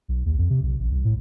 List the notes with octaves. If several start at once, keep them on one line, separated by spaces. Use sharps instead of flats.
B1
D#2
F2
C3
B1
A1
C2
A2